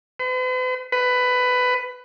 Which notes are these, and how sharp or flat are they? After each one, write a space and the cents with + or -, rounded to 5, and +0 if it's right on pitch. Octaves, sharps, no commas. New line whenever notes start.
B4 +45
B4 +15